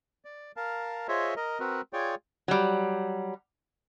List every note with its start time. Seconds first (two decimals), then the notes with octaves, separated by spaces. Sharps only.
0.25 D5
0.57 A#4 F5 A5
1.08 F4 G#4 C5 C#5 D#5 E5
1.37 A#4 D#5
1.60 C4 F#4 A#4 B4
1.93 F4 G#4 C#5 D5 G5
2.48 F#3 G3